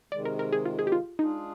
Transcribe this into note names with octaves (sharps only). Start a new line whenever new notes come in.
C3 D#3 G#3 D5
A#4
A#4
G#4
F4
G#4
G4
F4
G#3 D4 D#4 F4 G#4